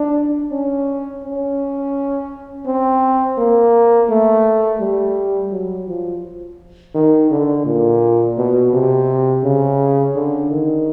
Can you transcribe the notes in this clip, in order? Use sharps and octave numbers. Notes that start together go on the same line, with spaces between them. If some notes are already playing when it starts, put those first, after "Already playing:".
Already playing: D4
C#4
C#4
C4
A#3
A3
G3
F#3
F3
D#3
D3
A#2
B2
C3
C#3
D3
D#3